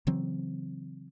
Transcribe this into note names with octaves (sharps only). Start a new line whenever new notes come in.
C#3 E3 F#3 C4